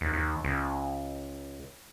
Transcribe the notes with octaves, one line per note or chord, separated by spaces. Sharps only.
D#2
D#2
C#2